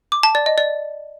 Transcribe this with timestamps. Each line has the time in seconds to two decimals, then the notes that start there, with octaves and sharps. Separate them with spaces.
0.12 D6
0.23 A5
0.35 D5
0.46 D#5
0.58 D5